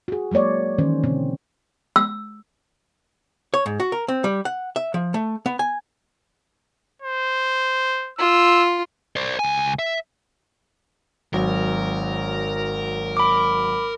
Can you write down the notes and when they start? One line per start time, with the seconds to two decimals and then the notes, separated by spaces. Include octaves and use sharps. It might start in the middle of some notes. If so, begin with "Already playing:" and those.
0.08 F#4 G#4
0.31 F#3 G#3 A#3 C#5 D5
0.78 D#3 E3 C#4 C5
1.04 B2 D3 D#3 C4
1.96 E6
3.54 C#5
3.66 G#2
3.80 F#4
3.92 A#4
4.08 C4
4.24 G3
4.45 F#5
4.76 E5
4.94 F3
5.14 A3
5.46 B3
5.59 G#5
7.02 C5
8.19 F4 E6
9.16 C5 D5
9.39 C#2 G#5
9.79 E5
11.34 G#1 F#3 A#4
13.17 B5 D6